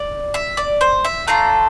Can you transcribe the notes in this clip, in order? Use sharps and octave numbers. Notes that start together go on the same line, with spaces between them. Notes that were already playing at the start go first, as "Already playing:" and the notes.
Already playing: D5
E5
D5
C5
E5
A3 D4 F4 A4 A#5